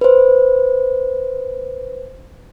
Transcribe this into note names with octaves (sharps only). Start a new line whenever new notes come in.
B4 C5